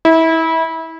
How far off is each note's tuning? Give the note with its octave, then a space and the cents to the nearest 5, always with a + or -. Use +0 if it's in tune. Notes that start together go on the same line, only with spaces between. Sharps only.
E4 -25